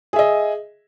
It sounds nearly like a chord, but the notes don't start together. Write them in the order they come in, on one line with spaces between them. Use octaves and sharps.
G#4 E5 D#5